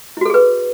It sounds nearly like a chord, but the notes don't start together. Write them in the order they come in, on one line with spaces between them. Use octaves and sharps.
E4 F#4 A4 G#4 B4